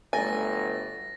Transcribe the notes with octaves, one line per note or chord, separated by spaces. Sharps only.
G1 F#3 A3 G#5 A6 A#6